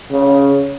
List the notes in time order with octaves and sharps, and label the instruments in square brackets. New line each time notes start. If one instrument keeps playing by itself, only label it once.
[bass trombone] C#3